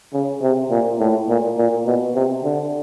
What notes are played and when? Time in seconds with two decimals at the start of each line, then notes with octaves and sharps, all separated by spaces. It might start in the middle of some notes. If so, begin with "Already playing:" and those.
0.13 C#3
0.42 C3
0.71 A#2
0.99 A2
1.28 A#2
1.58 A#2
1.86 B2
2.15 C3
2.43 D3